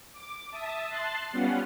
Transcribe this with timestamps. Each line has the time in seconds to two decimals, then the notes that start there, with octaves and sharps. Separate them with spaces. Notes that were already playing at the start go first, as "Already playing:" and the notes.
0.12 D6
0.51 E5 A5 D#6
0.88 A5 C6 F#6 A6 C7
1.31 G3 B3 C#4 F4 F#5